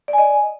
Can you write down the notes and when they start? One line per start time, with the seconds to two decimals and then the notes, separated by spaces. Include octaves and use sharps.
0.08 D5
0.13 G#5
0.18 D#5